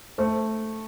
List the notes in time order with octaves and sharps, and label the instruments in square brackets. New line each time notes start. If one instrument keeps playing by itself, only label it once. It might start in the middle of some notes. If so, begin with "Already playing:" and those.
[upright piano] A3 [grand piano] C5